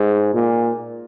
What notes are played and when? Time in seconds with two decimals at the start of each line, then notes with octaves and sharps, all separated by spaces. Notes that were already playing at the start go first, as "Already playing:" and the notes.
Already playing: G#2
0.34 A#2